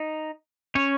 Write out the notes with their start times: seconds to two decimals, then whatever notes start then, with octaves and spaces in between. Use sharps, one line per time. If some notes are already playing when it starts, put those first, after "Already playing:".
Already playing: D#4
0.75 C#4 C#5